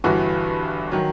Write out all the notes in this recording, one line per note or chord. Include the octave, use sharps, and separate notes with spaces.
G1 G2 E3 F#4
D#3 F#3